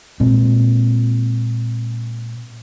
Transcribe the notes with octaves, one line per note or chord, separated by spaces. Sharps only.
A#2 G#3 C4